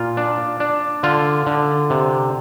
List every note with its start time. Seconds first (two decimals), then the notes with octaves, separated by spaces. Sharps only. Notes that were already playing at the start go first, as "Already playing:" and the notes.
Already playing: A#2 F4
0.17 D4
0.60 D4
1.03 D3 F4
1.46 D3
1.90 C3